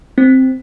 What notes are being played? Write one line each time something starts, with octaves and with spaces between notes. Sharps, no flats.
C4